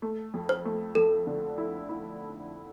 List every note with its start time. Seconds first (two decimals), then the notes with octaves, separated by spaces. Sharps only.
0.02 A3
0.34 F2
0.49 C5
0.65 A3
0.95 F2 A4
1.27 D3
1.58 E4
1.89 E4